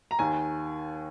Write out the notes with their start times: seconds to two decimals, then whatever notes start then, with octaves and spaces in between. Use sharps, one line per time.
0.11 A#5
0.19 D#2 D#3 G#5